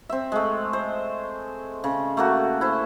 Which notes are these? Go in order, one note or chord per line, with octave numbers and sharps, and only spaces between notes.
C4 E5
G#3 A3
C5
C#3
A3 A#3 F#4
E4 C5